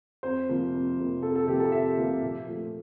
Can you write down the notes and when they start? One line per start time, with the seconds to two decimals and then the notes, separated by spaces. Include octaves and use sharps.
0.23 F2 C5
0.49 C3 F3 A#3
0.73 F2
0.98 C3 F3 A#3
1.23 F2 A4
1.35 A4
1.47 C3 F3 A#3 G4
1.60 A4
1.72 F2 E5
1.97 C3 F3 A#3
2.22 A#2
2.47 F3 A3